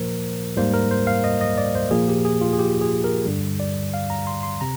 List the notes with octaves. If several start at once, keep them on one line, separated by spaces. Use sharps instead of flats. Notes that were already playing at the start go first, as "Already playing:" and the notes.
Already playing: A#2 F3 A#3 A#4 C5
G#2 G3 A#3 C5
A#4
C5
F5
D#5
D#5
D5
C5
A#2 F3 A#3 G#4
G4
G#4
F4
G#4
G4
G#4
A#4
G2 D3 G3
D5
F5
A#5
C6
C6
C3 A#5